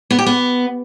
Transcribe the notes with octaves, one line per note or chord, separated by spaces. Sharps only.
B3
G4
B3